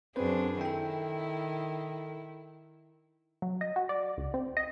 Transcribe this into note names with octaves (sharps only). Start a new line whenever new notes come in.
F#2 C4 D4 G#4 B4 C5
D#3 E4 A4 G5
F#3
D#5
F#4
D5
C#2
C4
D#5